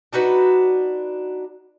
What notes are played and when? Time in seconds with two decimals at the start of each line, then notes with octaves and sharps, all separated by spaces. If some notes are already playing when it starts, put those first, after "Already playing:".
0.13 D4 D#4 F#4 B4